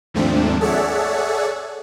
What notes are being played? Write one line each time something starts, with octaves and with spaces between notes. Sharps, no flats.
D#2 G#2 F3 A3 C4 D4
G#4 A4 C#5 D5 E5 F#5